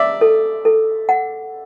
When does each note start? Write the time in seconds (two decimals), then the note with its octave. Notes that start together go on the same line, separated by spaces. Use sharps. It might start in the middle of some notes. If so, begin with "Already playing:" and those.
Already playing: D5 E5
0.21 A4
0.65 A4
1.09 F#5